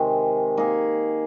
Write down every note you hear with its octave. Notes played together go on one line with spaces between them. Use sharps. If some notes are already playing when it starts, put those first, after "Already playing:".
Already playing: C3 D#3 G#3
A#3 D#4 G#4